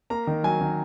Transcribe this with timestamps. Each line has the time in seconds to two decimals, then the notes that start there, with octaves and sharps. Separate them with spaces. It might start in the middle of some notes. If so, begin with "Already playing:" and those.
0.10 A#3 A#5
0.27 D#3
0.44 F#3 G#5
0.61 D#3